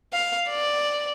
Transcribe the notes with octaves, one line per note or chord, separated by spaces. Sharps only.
F5
D5